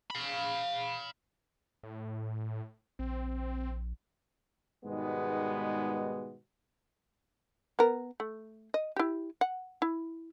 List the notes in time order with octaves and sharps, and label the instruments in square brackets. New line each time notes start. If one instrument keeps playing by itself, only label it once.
[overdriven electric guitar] F5 B5
[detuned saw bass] A2
[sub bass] A#1 [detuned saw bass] C4
[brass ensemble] G#2 B2 D#3 G3 G#3 B3
[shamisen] B3 A#4
A3
D#5
E4 G4
F#5
E4